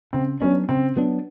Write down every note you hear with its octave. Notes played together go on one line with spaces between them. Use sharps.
C#3 C4
F#3 B3 C#4 D4
C#3 C4
F#3 B3 D4